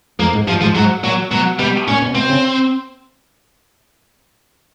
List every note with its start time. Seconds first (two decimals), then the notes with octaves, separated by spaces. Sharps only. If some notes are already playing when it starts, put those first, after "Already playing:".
0.19 F2 A#3
0.33 G#2
0.47 G2 F3
0.61 G#2 F3
0.75 G#2 F#3
1.03 A#2 F#3
1.31 B2 F#3
1.59 B2 G3
1.88 A#2 C#4
2.02 B2
2.15 B2 C4
2.29 C#3